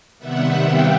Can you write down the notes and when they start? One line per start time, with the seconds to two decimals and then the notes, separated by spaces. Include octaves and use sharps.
0.19 C3 D#3 G3 B3 E5 F#5
0.63 F5 G5